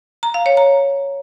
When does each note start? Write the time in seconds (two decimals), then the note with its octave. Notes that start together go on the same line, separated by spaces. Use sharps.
0.23 A#5
0.34 F5
0.46 C#5
0.57 A#5